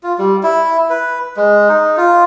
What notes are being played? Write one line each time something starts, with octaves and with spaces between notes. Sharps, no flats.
F4
G3
E4
B4
G#3
D#4
F4